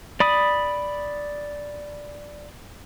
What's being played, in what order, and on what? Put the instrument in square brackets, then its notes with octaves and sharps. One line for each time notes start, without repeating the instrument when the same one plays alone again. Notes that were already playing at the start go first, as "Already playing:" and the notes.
[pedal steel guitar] D5 B5 D#6